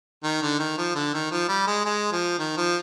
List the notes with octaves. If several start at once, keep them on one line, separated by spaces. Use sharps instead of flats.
D#3
D3
D#3
F3
D3
D#3
F3
G3
G#3
G#3
F3
D#3
F3